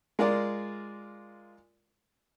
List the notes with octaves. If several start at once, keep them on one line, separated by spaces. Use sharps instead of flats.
G#3 F4 A#4 D5